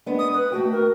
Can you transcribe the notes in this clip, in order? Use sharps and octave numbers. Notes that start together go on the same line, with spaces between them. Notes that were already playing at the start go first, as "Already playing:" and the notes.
G#3 B3 D4
D#6
B4
A3 F#4 G5
A#4